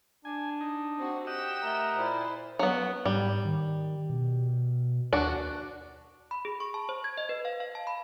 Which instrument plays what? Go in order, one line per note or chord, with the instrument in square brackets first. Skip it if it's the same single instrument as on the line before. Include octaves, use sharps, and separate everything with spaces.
[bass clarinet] D4 [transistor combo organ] G#5
[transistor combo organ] D#4
[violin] C4 F#4
[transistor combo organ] G4 D#5 F#5 [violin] G5 E7
[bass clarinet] A3 [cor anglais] A#4
[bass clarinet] A#2 [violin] E4 C5
[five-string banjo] F#3 B3
[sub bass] G#2 [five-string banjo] G3
[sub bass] D#3
B2
[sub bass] D#2 [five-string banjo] D4 F#4
[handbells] B5
G#4
C#6
A5
C5
G#6
D#5
B4
F5
F5
A5
B5